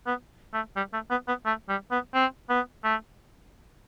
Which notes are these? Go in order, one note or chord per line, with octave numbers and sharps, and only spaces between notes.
B3
A3
G3
A3
B3
B3
A3
G3
B3
C4
B3
A3